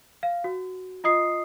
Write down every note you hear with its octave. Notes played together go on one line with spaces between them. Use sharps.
F5
F#4
F4 D#5 D#6 C7